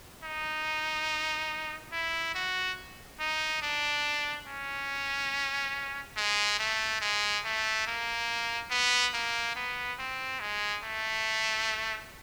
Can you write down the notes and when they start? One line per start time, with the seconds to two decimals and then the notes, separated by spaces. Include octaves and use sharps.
0.24 D#4
1.92 E4
2.35 F#4
3.20 D#4
3.62 D4
4.47 C#4
6.17 G#3
6.59 A3
7.01 G#3
7.44 A3
7.87 A#3
8.71 B3
9.14 A#3
9.56 B3
9.99 C4
10.40 G#3
10.83 A3